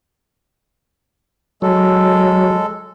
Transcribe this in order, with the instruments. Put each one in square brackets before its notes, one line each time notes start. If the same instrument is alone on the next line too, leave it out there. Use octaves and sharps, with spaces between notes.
[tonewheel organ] F#3 [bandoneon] G#3 A4